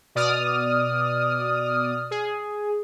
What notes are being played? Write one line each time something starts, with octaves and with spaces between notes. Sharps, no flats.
B2 D5 D#6 F6
G#4